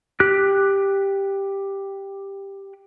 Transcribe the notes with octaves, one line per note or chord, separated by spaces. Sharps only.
G4 F#6